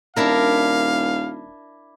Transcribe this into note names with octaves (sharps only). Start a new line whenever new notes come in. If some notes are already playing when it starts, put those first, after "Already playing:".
D#1 D4 E4 A#4 F5